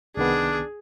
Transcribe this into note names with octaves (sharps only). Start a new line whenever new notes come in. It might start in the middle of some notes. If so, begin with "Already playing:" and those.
C2 D#3 B3 D4 G#4